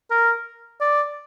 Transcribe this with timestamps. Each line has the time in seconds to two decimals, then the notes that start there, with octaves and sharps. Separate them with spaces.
0.11 A#4
0.81 D5